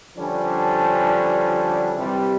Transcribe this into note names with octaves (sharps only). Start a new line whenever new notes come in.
D3 F3 G3 C#4 D4
C3 E3 G3